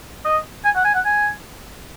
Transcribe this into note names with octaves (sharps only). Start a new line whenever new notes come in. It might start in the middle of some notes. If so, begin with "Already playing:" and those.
D#5
G#5
F#5
G#5
F#5
G#5